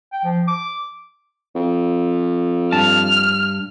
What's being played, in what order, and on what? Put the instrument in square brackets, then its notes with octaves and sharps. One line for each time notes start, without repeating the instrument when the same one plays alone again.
[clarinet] G5
F3
D6
[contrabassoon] F2
[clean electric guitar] G2 A5 [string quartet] F6